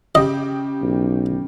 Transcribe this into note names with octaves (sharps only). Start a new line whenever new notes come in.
C#3 G4 D#5
B1